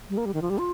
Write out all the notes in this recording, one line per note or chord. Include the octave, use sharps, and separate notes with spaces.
G3
A#3
G3
D#3
F3
G3
F4